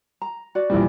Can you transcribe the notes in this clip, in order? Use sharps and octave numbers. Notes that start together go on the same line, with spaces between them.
A#5
F#4 D5
A#1 E3 G3